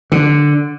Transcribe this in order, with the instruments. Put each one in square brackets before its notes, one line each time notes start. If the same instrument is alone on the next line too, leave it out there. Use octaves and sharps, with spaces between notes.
[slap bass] D3